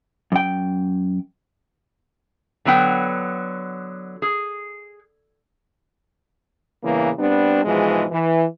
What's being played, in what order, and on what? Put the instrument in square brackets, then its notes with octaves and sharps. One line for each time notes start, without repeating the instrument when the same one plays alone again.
[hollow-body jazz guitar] F#2 G5
[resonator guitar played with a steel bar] D3 F#3 B3 G5
G#4
[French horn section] E2 G2 C#3 E3 A#3
G3 B3 C4 D4
G#2 B2 E3 F3 G#3
E3